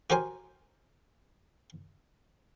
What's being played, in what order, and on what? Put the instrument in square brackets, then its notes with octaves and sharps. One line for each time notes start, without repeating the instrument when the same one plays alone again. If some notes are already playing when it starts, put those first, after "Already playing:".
[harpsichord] F#4 G4 A#4 C5 G#5